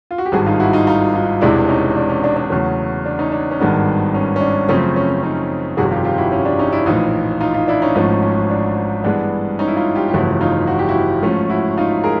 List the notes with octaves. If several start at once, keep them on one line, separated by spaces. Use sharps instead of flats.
F4
F#4
G4
G#1 G2 D#3 F#4 G#4
D#4 F4
E4 F#4
D#4 F4
D#4 F4
D#4 F4
E1 E2 C3 E3 G#3 D4 E4
C#4 D#4
D4
C#4
D4
D4
E2 C#3 F#3 A3 C#4
D4
C#4 D#4
D4
C#4
G#1 G2 D#3 G#3 B3 D4
C#4
C#4
D4
F#2 C#3 F3 A3 C4 C#4
C#4
C#4
C#4 D#4
G1 F2 C3 D#3 G3 F#4 G#4
F4 G4
F4 G4
E4 F#4
C#4
D4
C#4 D#4
D4 E4
A#1 A2 E3 D#4 F4
D#4 F4
D#4 F4
D4 E4
C#4 D#4
G#1 G#2 F3 A3 C#4 D#4
C#4
D4
G2 E3 G#3 B3 D4
C#4 D#4
E4
D#4 F4
F4 G4
G4
G1 F2 C#3 E3 A3 E4 F#4
D#4 F4
F#4
G4
E4 F#4
G#2 F3 A3 C#4
E4 F#4
D#4 F4
G#4 A#4